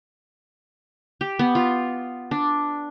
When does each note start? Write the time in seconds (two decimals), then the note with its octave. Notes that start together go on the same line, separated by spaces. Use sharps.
1.21 G4
1.39 B3
1.55 F4
2.31 D4